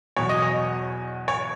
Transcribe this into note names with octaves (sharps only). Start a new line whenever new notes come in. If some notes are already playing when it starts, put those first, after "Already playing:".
E2 B2 F#3 C#5
D#5
C#5
C#5